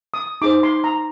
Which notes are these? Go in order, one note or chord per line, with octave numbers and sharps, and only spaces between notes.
D#6
D#4 G#4 C5 D6
C6
A#5